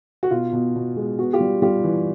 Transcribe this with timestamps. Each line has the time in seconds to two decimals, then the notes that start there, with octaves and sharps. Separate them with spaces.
0.23 F#4
0.31 B2 F4
0.53 B2
0.76 B2
0.97 G#3
1.19 B3 F#4
1.33 F4 G4
1.40 G3
1.62 G3 F4 G4
1.84 E3